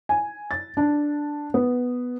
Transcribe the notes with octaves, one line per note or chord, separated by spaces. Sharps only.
G#5
A6
D4
B3